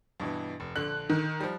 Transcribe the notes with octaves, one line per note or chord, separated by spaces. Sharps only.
G2 B2 E3
F1
A#1 D3 F#6
D#3
F3 G3